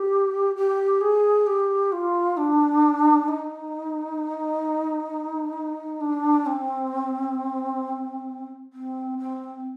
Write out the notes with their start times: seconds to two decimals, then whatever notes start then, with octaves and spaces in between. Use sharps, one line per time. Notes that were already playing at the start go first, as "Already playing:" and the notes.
Already playing: G4
0.56 G4
1.01 G#4
1.47 G4
1.92 F4
2.37 D4
3.28 D#4
6.01 D4
6.46 C4
8.73 C4
9.19 C4